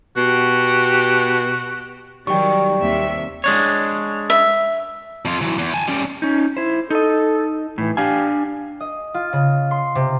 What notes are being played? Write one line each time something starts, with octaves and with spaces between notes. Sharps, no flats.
B2 F#4 G4
D#3 F#3 G3 G5 C#6
D#2 C3 E5
G#3 D4 C#5
E5
F2 F4
E3 F#3
E2
G#5 A5
G3 C#4
C#4 D#4
E4 C5
D#4 A4 D#5
A2 E3
D4 G4 F5 G#5
D#5
F4
C#3
C6
C3